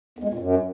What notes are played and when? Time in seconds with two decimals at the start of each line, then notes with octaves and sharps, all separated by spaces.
0.18 E2
0.24 G#3
0.29 E2
0.34 A#2
0.39 F#2